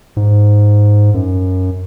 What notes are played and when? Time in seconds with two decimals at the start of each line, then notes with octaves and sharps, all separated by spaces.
0.17 G#2
1.14 F#2